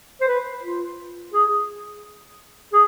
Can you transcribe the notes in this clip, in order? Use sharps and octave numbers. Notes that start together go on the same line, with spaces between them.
C5
B4
F4
G#4
G#4